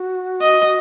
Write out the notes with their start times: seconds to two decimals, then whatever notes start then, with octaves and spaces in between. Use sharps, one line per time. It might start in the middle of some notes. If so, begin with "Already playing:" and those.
Already playing: F#4
0.41 D#5